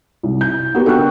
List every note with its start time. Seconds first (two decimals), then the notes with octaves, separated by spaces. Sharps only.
0.23 C2
0.41 G6
0.75 B3 F#4 G4 A#4 B4
0.86 D3 A4 G5 C#6 F#6